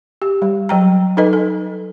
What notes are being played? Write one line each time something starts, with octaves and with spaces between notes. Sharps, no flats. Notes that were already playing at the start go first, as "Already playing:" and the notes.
G4
G3
F#3 G5 A#5
D#4 A4 B4 D#5
A4